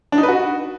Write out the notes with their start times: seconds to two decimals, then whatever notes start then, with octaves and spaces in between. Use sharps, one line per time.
0.12 D4
0.18 D#4
0.23 B4
0.28 F#4